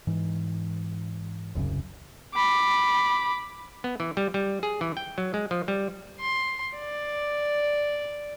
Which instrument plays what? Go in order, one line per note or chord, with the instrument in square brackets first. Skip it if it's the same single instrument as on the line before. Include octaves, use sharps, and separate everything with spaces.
[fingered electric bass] G#2 E3
D#1 C2 F#2 C#3
[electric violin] B5 D6
[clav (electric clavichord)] B3
E3
G3
G3
G#4
E3
G5
F#3
G#3
F3
G3
[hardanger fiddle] C6
D5